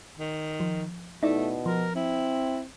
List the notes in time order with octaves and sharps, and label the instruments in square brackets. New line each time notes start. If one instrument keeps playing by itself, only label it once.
[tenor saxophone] D#3
[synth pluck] F3
[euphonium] B2 [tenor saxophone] A3 [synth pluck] D#4 E4 D5
[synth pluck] F3 [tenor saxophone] A#4
[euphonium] C4 [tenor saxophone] E4